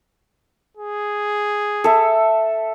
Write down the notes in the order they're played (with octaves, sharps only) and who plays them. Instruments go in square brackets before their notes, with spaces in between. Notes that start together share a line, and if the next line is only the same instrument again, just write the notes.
[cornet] G#4
[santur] A4 E5